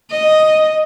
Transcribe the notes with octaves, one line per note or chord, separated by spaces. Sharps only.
D#5